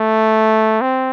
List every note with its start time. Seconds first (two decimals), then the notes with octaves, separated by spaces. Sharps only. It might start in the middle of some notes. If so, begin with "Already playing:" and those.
Already playing: A3
0.81 C4